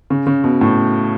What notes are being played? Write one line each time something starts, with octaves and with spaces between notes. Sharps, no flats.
C#3
C#3
B2
A2